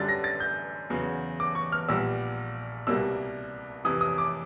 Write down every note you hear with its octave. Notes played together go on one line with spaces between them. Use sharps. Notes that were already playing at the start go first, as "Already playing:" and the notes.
Already playing: F#2 D3 G3 A6
A#6
A6
G6
E2 C#3 F#3
D6
C#6
F6
A#1 A#2 G3 B3 E6
C2 B2 G3 A#3 E6
F2 C3 E3 D#6
D#6
D6